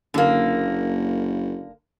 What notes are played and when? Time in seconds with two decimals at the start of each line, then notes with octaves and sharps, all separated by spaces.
0.14 F#1 D3 A#3